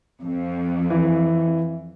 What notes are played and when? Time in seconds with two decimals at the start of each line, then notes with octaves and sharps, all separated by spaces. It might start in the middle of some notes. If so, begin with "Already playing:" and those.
0.23 F2
0.90 E3